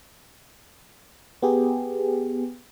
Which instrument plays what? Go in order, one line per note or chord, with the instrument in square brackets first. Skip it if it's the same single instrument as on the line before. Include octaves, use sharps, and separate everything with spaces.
[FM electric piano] B3 G4 G#4